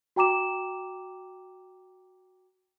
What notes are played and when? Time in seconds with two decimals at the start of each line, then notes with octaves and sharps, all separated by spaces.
0.16 F#4 G5 A#5 D6 E7